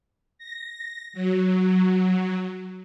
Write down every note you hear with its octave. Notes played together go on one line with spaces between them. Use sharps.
A#6
F#3